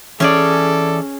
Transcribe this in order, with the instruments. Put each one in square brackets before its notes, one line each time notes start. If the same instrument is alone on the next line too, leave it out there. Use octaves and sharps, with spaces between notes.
[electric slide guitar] E3 D5 [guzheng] C#4 G#4 [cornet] A4